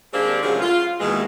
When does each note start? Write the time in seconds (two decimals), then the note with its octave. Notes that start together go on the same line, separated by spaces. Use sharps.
0.13 D#3 G#3 A#3 C4 D4 G4
0.41 C#3 F3 F#3 G#3 A3 A#4
0.61 F4
1.00 D#2 B2 E3 G#3